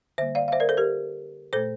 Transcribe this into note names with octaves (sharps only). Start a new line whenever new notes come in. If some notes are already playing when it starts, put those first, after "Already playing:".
D3 G3 A#3 C5 E5
D5 F5
F5
C5 E5
A#4 D5
A4 C5
G4 A#4
A#2 A3 A4 C5